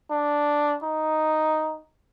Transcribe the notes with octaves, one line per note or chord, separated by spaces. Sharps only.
D4
D#4